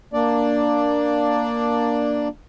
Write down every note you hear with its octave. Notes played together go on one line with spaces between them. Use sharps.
A#3 D4 D5